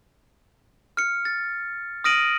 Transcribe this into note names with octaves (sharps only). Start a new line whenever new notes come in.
F6 C#7
A6
D#6 F6 A#6 D7 D#7 F#7